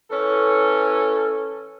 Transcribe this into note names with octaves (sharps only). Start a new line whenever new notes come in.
E3 C#4 A4